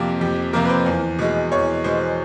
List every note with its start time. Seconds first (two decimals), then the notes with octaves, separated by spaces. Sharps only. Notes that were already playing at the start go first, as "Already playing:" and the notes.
Already playing: F2 C3 F3 A#3 G4
0.21 F2 G4
0.53 C3 F3 A#3 A#4
0.65 B4
0.69 C5
0.86 E2
1.19 B2 G#3
1.52 E2 C#5
1.84 B2 G#3 C5